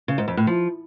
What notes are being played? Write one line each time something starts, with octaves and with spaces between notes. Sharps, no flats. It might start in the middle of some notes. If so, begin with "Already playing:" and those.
C#3
G#2
F2
A2
F3